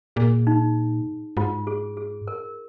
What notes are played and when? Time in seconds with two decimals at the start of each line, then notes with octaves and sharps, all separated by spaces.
0.16 A#2 G#4
0.47 D#4
1.37 G#2 F4
1.67 G#4
1.97 G#4
2.27 A#4